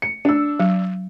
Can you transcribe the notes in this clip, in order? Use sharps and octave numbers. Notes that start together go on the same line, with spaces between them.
C#7
D4 E6
F#3